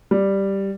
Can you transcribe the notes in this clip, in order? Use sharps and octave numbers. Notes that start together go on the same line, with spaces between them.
G3